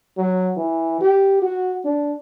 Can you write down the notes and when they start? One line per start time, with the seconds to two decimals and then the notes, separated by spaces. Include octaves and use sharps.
0.17 F#3
0.56 E3
1.01 G4
1.42 F#4
1.85 D4